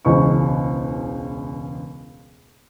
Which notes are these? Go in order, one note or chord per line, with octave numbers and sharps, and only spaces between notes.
E1 C#2 E3 C5 D#5 C#6